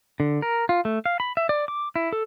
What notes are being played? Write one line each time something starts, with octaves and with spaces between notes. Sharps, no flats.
D3
A#4
F4
A3
F5
B5
E5
D5
D6
E4
A4